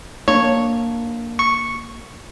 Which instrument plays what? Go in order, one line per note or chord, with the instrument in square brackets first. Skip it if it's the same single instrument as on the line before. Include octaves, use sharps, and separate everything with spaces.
[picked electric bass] A#3 D4 [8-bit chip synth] C#5
[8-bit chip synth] C#6